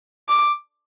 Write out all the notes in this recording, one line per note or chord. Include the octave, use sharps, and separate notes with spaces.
D6